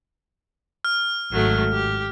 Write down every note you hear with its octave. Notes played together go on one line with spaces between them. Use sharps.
F6
G#1 F#3 A3
G4